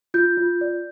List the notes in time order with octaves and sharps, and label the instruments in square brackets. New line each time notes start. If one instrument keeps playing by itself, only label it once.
[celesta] F4 G6
F4
D5